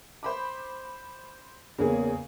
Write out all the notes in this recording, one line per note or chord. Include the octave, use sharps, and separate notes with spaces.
C5 B5 D6
E2 C#3 A#3 C#4 G#4